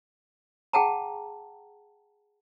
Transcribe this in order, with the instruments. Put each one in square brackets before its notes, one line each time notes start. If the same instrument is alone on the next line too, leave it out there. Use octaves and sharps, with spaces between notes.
[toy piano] G#4 F#5 G5 A5 A#5